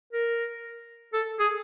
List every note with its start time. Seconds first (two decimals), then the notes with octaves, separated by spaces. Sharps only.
0.13 A#4
1.13 A4
1.39 G#4